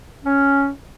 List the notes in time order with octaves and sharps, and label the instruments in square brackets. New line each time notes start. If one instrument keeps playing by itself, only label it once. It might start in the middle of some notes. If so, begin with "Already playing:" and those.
[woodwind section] C#4